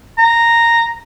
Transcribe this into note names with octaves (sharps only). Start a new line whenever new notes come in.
A#5